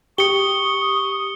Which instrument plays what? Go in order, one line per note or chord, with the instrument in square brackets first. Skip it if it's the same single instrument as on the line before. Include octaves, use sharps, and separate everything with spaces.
[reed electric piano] G4 [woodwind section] C#6 D#6 [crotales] C#7 G7